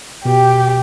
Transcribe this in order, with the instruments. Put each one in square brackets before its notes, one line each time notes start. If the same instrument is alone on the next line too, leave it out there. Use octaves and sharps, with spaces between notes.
[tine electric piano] B2 [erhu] G4